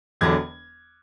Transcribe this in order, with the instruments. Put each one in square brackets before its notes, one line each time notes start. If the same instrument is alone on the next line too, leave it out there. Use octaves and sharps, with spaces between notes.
[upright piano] E1 E2 D3 F#3 G#6